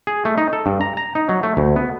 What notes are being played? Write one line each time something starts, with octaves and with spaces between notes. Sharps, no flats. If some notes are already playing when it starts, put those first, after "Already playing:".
G#4
A3
D#4
A4
G2
A#5
A#5
D#4
F#3
A3
D2
B3